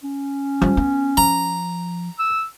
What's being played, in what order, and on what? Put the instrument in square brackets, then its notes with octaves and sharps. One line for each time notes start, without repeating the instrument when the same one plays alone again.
[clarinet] C#4
[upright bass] F3 G3
B3
[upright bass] F3 [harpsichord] A#5
[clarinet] E6